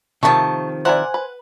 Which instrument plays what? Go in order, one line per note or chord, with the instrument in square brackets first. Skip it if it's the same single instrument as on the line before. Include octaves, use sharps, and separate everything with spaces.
[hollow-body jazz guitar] C3 D#3 F3 [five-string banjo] A3 B5 [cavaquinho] A5 C#6
[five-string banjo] E4 A#4 D5 [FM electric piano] C5 G#5 [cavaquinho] F#5
[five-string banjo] B4